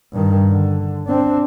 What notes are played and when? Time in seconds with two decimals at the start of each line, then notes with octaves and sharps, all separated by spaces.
0.13 G2 D#3
0.49 D3
1.07 C4 D4